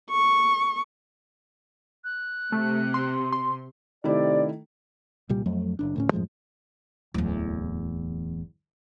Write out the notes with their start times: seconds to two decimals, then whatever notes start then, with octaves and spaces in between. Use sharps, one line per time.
0.11 C#6
2.04 F#6
2.52 C3 A3
2.94 C6
3.32 C6
4.04 C3 D#3 A3 E4 D5
5.29 C2 A#2 G3
5.46 F2 F#3 A3
5.79 F#1 D4
5.96 D2 A2 C#4
6.12 F#2 A2 F3 G#3
7.14 D1 E2